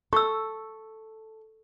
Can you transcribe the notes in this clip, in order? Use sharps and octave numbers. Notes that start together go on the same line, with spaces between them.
A4 C#6 E6